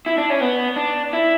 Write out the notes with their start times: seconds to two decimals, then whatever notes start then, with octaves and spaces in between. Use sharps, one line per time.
0.06 E4
0.18 D4
0.30 C#4
0.41 B3
0.76 D4
1.13 E4